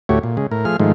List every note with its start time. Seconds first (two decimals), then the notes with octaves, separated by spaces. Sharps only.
0.09 D2 A2 A3 F#4 G4 C#5
0.23 A#2
0.37 C#3 G#3
0.51 A2 A#4
0.65 F3 A3 G#4 F6
0.80 G#2 D#3 F3 G#3 A3